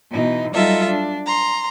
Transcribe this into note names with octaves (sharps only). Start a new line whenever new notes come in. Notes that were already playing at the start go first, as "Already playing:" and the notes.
B2 E3 D#4
F#3 G3 D#4 F4 A4 E5
D4
A#5 C6